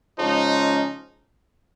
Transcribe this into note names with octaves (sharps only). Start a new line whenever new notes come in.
C#3 F3 G#3 C#4 D#4